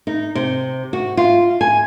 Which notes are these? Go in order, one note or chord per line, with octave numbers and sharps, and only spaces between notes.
D#4
C3
F#4
F4
G#5